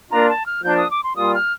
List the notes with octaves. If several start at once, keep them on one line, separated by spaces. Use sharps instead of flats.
A#3 D4 F4 A#5
A5
F6
F3 A#3 D4 G6
D#6
D6
C6
A#2 G3 A#3 F4 D#6
F6